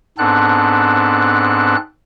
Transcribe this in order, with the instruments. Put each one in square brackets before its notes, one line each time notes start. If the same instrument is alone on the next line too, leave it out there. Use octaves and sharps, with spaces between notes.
[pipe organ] G#2 B3 C4 D4 A4 F#6